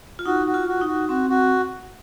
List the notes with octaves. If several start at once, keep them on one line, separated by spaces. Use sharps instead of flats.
F4
D#4 F#4
F#4
F4
F#4
D#4
F#4
C4 F#4
F#4